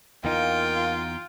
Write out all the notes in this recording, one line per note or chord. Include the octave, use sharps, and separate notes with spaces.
E2 A#3 D#4 F4 G5